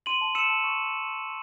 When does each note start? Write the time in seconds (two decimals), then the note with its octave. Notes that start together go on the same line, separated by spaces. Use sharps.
0.06 C6 D#7 F#7
0.21 A5
0.35 E6 C#7 E7
0.50 A5
0.64 C#6